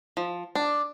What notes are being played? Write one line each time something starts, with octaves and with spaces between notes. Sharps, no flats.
F3
D4